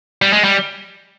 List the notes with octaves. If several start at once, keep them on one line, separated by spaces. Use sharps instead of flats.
G3
G#3
G3